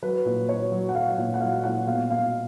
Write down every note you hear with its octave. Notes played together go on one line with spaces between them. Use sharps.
F#3 B4
A#2
F#3 C#5
F#3
F#5
F#3 F5
A#2
F#5
F#3 F5
A#2 F#5
B2 F5
B2 F5